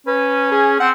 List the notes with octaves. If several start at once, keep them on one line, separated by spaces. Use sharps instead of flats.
C#4 B4
G#4
C4 F#5